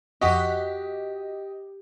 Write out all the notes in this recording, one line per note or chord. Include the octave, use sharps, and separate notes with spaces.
F2 F#4 G4 D#5 F#5 B6